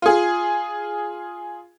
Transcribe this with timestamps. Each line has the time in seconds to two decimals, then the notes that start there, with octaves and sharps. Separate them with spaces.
0.02 F4 G#4